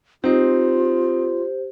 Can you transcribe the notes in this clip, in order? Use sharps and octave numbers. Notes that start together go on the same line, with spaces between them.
C4 D#4 F4 G4 C5